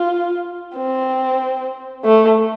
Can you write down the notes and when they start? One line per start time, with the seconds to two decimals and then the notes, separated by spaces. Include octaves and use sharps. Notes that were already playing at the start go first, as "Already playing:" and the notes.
Already playing: F4
0.76 C4
2.04 A3